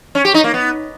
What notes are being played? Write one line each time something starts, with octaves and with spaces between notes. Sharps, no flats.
C#4
G4
D#4
A#3
B3